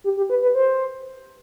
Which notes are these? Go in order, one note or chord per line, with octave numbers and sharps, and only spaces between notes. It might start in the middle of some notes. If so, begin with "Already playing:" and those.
G4
G4
B4
B4
C5